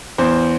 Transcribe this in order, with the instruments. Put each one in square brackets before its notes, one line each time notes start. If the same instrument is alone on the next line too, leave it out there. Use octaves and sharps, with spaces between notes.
[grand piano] E2 C5